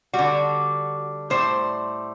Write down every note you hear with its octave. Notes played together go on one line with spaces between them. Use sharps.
G3 F#4
D3
A2 G3 C5